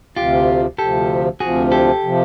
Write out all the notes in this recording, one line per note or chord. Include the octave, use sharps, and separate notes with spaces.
D2 C3 F3 F4 G4
D2 C3 F3 G4 A4
D2 C3 F3 F#4 G#4
G4 A4
C3 F3